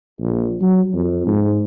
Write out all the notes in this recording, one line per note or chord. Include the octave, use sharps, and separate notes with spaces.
A#1
F#3
F2
G#2